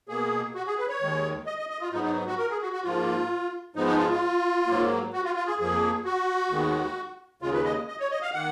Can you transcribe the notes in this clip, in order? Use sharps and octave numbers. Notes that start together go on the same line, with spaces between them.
B2 A#3 G#4
F#4
G#4
B4
C#5
D#2 D#3 G#3
D#5
D#5
D#5
F4
G#2 F#3 B3 D#4
D#4
F#4
A#4
G#4
F#4
F#4
G#2 F3 A#3 F4
G#2 F3 G#3 B3 D#4
D#4
F4
F4
G#2 F#3 A#3
F#4
F4
F4
G#4
F2 F3 A#3 G#4
F#4
D#2 D#3 G#3 B3
D#2 C#3 G#3 F4
B4
D#5
D#5
C#5
D#5
F5
D#3 A#3 F#5